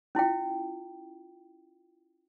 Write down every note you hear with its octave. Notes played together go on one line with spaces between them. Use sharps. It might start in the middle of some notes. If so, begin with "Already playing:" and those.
C#4 E4 F4 G5